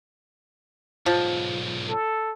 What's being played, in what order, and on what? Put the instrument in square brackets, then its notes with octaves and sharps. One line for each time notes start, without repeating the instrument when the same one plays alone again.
[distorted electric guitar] B1 G#2 [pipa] F3
[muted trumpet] A4